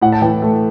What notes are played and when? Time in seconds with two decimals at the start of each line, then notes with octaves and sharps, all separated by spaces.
0.02 A2 F#5
0.12 A5
0.22 E3 G5
0.42 A3